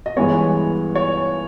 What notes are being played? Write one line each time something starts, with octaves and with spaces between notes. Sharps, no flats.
D#5
G2 E3 G#3 B3 C#5
C#5